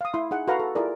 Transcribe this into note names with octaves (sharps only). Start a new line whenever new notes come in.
F5 D#6
E4 C6
D#4 G#4 F#5
F#4 A4 B4 F5 F#5 A#5
A4
E4 F4 G#4 A#4 D5